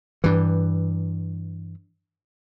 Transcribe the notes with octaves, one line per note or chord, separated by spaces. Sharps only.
G2 E3